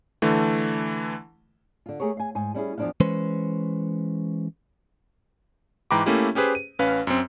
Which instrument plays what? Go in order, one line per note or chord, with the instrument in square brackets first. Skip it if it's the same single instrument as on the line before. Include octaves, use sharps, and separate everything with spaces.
[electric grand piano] D3 E3 A3
[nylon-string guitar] D3 F4
A3 G4 G#4 A#4 C#5
F5 G#5
G#2 G#5
G3 C#4 E4 G#4
E2 F3 G#3 D4 E4 F5
[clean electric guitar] E3 G#3 C#4 B4 C5
[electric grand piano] G#2 E3 G5 A#5 B5 D6
A3 A#3 C#4 E4 G4
C#4 G4 G#4 B4 C5
D#7
A1 C#4 B4 F5
F#2 C4